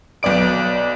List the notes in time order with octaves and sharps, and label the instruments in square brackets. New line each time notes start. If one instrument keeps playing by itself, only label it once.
[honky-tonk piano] B1 B3 D5 D7